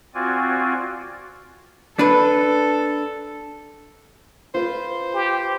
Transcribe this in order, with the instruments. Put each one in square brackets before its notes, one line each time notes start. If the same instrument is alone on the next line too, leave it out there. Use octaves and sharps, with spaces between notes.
[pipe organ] C4 F4 F#4 D5 G#5
[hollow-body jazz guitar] D4 B4 [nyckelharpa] A4
[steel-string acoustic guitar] F4 B4 [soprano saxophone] C5
[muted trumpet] G4